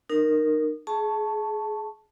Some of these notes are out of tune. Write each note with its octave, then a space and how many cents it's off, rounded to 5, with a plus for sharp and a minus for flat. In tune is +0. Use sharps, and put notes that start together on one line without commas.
D#4 -30 A#4 +0
G#4 +20 A5 +0 C#6 +0